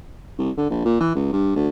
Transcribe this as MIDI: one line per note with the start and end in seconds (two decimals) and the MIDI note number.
0.38 0.50 36
0.57 0.66 50
0.70 0.84 34
0.85 0.97 46
1.01 1.11 52
1.15 1.28 37
1.33 1.53 43
1.56 1.69 38